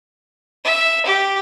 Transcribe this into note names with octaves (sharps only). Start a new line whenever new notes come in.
E5
G4